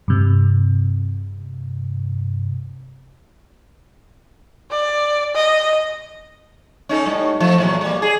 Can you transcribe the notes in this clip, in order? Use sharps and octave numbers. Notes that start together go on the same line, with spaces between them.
G2 C3
D5
D#5
C#4 D#4 A4
A2 G3
F3 A3
E2 A#2 F#3
G3 A#3
G#4